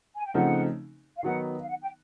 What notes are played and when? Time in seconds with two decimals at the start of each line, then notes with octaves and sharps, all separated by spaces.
0.16 G#5
0.25 G5
0.34 C#3 F3 A3 C4 D#4 F#5
1.16 F5
1.23 D#3 F#3 B3 D#4 F#5
1.60 F5
1.68 F#5
1.82 G5